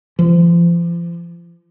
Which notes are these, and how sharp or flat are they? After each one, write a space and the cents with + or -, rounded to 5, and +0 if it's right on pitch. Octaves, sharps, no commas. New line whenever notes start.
F3 -40